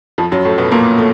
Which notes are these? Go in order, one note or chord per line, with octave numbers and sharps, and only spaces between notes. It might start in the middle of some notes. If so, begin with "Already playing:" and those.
F2 F3
F#2 F#3
A2 A3
B2 B3
A#2 A#3
A3